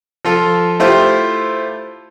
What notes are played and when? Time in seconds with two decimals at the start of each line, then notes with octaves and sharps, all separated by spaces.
0.25 F3 F4 A4
0.80 A3 E4 F4 G4 C5